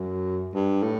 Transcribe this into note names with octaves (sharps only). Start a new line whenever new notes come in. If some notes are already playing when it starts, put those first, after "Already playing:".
Already playing: F#2
G2
A2